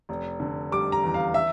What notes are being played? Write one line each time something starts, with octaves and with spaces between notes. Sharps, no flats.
F1
D3
G3 D6
A#5
E2
F5
E5